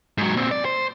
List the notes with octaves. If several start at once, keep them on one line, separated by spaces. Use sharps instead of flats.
G#2 F#3
A#2 C4
D5
C5